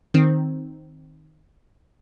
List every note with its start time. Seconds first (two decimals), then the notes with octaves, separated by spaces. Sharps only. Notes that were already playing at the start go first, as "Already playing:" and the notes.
0.14 D#3 C4